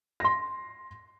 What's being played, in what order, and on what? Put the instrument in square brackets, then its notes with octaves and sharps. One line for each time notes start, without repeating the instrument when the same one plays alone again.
[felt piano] C6 A#6